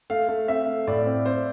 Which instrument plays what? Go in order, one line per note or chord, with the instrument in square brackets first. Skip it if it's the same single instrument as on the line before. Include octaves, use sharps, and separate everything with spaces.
[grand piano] A3 [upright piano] F5
[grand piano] A3
[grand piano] C4 [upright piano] E5
[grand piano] A3
[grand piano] A2 [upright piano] D5
[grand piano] C4
[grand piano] C4 [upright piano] C5